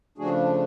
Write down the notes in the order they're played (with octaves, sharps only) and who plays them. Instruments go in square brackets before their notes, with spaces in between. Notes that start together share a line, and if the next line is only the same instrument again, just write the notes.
[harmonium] C#3 F3 A3 D4 F#4 G#4